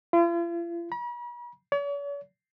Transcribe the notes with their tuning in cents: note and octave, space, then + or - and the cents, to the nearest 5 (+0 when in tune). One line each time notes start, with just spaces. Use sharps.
F4 -45
B5 -45
C#5 +45